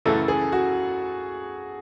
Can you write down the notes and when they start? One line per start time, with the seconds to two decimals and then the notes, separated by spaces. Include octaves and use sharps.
0.06 F#2 C#3 E3 A3 A4
0.28 G#4
0.52 F#4